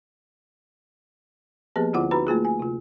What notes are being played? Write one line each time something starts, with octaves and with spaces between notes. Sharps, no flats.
F3 A#3 B3 G4 G#4 B4
D2 D3 E4 F4 F#5 D6
D#4 F#4 B4 A#5 B5
A3 A#3 F4 G#4
G#5
C3 F4